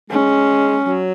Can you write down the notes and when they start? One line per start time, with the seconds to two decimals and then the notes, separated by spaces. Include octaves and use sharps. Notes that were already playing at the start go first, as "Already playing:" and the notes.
0.10 G#3 C#4
0.84 F#3